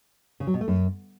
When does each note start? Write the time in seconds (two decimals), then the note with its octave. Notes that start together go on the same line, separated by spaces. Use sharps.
0.40 C#3
0.47 F#3
0.54 B2
0.61 A3
0.68 F#2